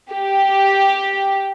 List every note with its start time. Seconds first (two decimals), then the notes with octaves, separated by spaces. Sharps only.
0.13 G4